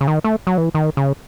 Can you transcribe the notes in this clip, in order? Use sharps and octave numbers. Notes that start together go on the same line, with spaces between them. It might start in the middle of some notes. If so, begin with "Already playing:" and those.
C#3
D#3
A3
F#3
E3
D#3
C#3